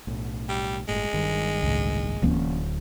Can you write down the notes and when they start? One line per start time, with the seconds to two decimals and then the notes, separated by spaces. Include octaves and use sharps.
0.07 B1 A2
0.49 G3
0.88 G1 A2 G#3
1.13 G1 G2 D#3
1.63 C#2 A2
2.22 D1 D2 E3 A#3 C#4